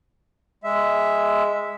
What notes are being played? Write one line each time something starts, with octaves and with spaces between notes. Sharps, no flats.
G#3 E5